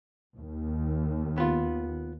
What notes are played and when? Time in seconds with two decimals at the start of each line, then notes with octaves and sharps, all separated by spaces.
0.37 D#2
1.38 B3 F4